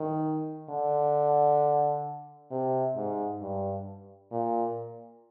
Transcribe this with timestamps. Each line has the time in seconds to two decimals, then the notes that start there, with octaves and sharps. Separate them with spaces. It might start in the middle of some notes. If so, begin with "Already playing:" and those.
Already playing: D#3
0.70 D3
2.51 C3
2.96 G#2
3.41 G2
4.32 A#2